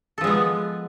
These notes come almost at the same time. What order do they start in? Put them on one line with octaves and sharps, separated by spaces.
A4 F3 G#3 B3